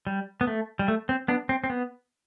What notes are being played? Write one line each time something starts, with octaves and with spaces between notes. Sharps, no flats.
G3
B3
A3
G3
A3
C4
B3 D4
C4
C4
B3